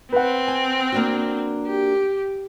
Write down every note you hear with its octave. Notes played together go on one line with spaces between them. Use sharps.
C4 B4 F#5
G#5
A#3 D4 F#4
G4